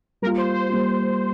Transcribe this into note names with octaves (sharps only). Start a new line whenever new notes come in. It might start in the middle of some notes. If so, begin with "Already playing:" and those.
G3 A#3 F4 A#4
C5
C5
G3 A#3 F4